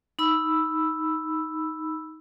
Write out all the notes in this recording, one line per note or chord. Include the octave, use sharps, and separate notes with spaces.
D#4 B5 E6